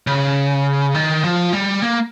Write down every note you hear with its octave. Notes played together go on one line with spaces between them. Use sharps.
C#3
D#3
F3
G3
A#3